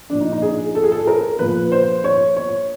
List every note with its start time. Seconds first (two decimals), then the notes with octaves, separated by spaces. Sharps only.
0.10 A#2 F3 D4
0.20 D#4
0.32 D#4
0.42 G#4
0.75 A4
0.83 G#4
0.92 A4
1.07 A#4
1.39 A#2 F3 B4
1.72 C5
2.04 C#5
2.37 C#5